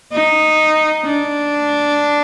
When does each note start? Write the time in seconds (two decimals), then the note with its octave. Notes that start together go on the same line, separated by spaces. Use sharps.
0.12 D#4
1.04 D4